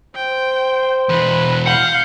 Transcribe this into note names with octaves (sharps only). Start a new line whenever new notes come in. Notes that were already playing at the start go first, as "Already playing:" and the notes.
C5 G5
E2 B2 B4
F5 F#5 G6